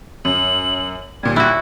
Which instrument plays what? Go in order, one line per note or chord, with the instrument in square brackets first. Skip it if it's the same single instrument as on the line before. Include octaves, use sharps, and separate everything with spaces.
[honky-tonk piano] F#2 [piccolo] F#7
[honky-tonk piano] D#2 A#2 G3 [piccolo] G#6
[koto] E4 F#4 [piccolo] F#6